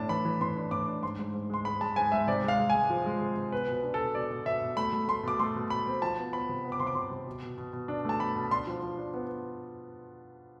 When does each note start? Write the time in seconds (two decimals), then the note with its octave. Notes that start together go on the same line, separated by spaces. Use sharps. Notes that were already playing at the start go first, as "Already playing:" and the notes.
Already playing: A2 D4 A5
0.09 E3 B5
0.25 E3
0.41 A2 C6
0.56 D4
0.71 A2 D6
0.87 D4
1.03 G#2 C6
1.19 G#2
1.34 G#2
1.50 G#3 C6
1.65 G#2 B5
1.81 G#3 A5
1.96 G#2 G#5
2.12 G#2 E5
2.27 C3 D5
2.44 G#3 F5
2.59 G#3
2.70 G#5
2.75 G#3
2.90 F3
3.06 G#3
3.21 C3
3.37 C3
3.52 B3 B4
3.68 B2
3.73 B4
3.83 D4
3.94 A4
3.99 B2
4.15 B2 D5
4.30 B2
4.46 B2 E5
4.61 B2
4.77 A3 B5
4.93 A3
5.08 A3 C6
5.23 B2 D6
5.39 A3 C6
5.55 B2
5.70 B2 B5
5.86 C4
6.02 F3 A5
6.18 B3
6.33 B3 B5
6.49 C3
6.64 B3
6.72 D6
6.80 C3 C6
6.87 D6
6.95 C3 C6
7.11 C3
7.27 B2
7.42 B2
7.58 B2
7.73 B2
7.88 D4
8.05 A3 A5
8.20 B2 B5
8.36 B2
8.51 D4 C6
8.67 F3
8.82 F3
8.97 D4
9.14 B3